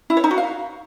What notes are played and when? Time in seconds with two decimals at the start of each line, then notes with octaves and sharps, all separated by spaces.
0.10 E4
0.17 C#5
0.24 D#4
0.31 F#4
0.38 F5